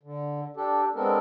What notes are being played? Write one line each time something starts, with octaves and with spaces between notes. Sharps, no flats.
D3
D4 G4 A4
G#3 B3 C4 D4 A4 A#4